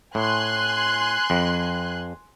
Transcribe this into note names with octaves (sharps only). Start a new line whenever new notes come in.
A2 G#5 C6 F#6
F2